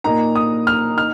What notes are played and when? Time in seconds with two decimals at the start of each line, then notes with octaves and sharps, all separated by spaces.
0.04 A#2 A#3 D#4 A#5
0.35 D#6
0.67 F6
0.97 D#4 F6